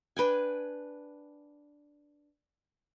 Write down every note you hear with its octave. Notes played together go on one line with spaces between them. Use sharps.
D4 B4 G5 G#5